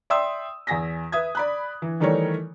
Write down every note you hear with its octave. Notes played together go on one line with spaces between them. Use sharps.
D5 E5 G5 C6 D#6 E6
E2 G#5 A#6 B6
B4 E5 D#6 G#6
D5 B5 F#6
E3
D#3 E3 G3 A3 A#4 C#5